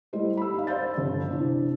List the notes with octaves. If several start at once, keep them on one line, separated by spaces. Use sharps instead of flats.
G3 A3 E4 G4 C5 D#5
B5 E6
D#4 F5
C5 D5 G6 A6
G1
C3 D4 E4